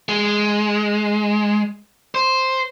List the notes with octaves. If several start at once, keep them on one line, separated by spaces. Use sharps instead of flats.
G#3
C5